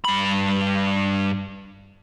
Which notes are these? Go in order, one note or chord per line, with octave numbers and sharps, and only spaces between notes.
G2 B5